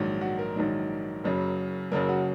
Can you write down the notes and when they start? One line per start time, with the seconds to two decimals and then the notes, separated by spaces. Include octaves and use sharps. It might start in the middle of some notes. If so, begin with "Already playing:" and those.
Already playing: A#1 G#2 D#3 F#3
0.21 F#4
0.39 A#4
0.56 A#1 G#2 D#3 F#3
1.24 F#1 F#2 C#3 F#3
1.91 F#1 F#2 C#3 F#3 A#4
2.09 F#4